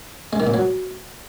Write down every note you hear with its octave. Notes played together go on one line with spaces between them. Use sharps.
G#3
D#3
A#2
F#3